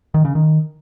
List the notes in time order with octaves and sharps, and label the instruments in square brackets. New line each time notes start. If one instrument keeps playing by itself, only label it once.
[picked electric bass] D#3
C#3
D#3